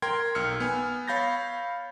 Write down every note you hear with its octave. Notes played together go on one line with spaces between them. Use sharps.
A#4 G5 C6 G#6
B1 E6 F6 C#7
B3 G#5
C#5 F5 B5 G6 A6 A#6